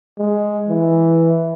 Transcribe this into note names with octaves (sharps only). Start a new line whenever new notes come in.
G#3
E3